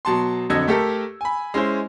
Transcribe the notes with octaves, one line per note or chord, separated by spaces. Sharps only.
B2 F#3 A5 C6
F2 D3 F#3 D#5 E6 G#6
A3 G4 A4 A#4
G#5 B5
G#3 C#4 E4 C5